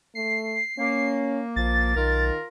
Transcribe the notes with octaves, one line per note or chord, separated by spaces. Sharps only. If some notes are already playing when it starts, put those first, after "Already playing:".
A3 C7
A#3 C#4
A#1 F3 A6
B1 D#3 F4 A#4